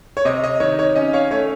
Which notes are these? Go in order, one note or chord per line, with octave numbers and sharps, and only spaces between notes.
C#5
C3 D#5
D#5
D#3 C#5
C#5
C#4 D#5
C#5 F5
A3 C#5